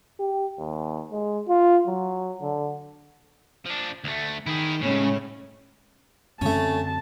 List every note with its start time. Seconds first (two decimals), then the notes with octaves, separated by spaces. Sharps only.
0.19 G4
0.59 D#2
1.12 G#3
1.48 F4
1.87 F#3
2.41 D3
3.66 F3 D4
4.04 D2 A3
4.46 D#3 E4 G#4
4.82 A2 C#3 G#3 C#4
6.41 F#2 D3 A3 C4 C#4 A5